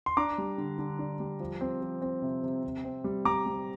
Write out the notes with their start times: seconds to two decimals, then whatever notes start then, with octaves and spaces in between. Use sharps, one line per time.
0.06 C6
0.17 D4 A#5 D6
0.38 G3
0.58 D3
0.79 D3
0.99 D4
1.20 G3
1.40 F3
1.61 C4
1.82 F3
2.02 C4
2.22 C3
2.43 C3
2.63 C3
2.84 C4
3.04 G3
3.25 G3 A#5 D6
3.46 G3